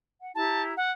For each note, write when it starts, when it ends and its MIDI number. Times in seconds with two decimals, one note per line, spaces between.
0.20 0.30 78
0.35 0.73 64
0.35 0.73 67
0.35 0.63 81
0.35 0.73 82
0.77 0.91 78